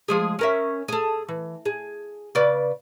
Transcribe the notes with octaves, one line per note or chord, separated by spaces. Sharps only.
F3 G#3 G#4
C#4 A#4 E5
G#4 A4
E3
G#4
C#3 B4 D5